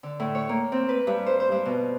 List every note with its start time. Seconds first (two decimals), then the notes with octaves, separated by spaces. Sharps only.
0.03 D3
0.20 A2
0.35 C#5
0.49 A#3
0.72 C4
0.89 B4
1.07 G2
1.26 C5
1.40 C5
1.52 G2
1.65 B2